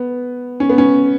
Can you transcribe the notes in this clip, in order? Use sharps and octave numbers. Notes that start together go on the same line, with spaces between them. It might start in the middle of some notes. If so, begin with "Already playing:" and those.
Already playing: B3
C#4
B3
C#4